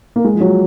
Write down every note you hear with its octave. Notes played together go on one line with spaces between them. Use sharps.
A#3
G#3
F3
F#3